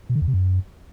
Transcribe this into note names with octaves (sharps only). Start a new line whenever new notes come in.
B2
D3
E2
C3
F#2